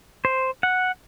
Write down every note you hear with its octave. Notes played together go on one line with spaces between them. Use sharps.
C5
F#5